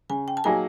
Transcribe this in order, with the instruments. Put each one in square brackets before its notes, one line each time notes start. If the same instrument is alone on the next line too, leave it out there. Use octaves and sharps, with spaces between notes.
[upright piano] C#3 [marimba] G#5
[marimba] G5
A5
[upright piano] F#3 A#3 D#4 G#4 [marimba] G#5